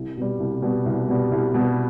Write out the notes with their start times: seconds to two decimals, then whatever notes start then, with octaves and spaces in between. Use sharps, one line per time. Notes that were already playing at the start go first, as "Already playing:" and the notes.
Already playing: C2
0.17 B2 G3
0.39 C2
0.62 B2 G3
0.86 C2
1.09 B2 G3
1.32 C2
1.54 B2 G3